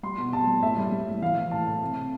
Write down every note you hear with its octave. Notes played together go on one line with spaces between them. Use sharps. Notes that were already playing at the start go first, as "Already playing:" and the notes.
G3 C6
B2
G3 A5
G3
A2 E5
G3
G3
A2
E3 F5
E3
A2 A5
A2
C3
C3